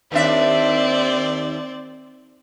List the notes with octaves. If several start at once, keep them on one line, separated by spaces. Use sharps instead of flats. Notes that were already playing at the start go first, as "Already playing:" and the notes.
D#2 C4 D4 D5 E5